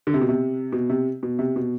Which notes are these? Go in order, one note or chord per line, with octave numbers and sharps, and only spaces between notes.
D3
C3
B2
C3
B2
C3
B2
C3
B2